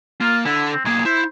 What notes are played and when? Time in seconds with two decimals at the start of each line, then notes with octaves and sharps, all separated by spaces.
0.21 A#3 F4
0.45 D3 E4 A4
0.72 C4
0.85 B1 A#3 G#4
1.05 E4 C5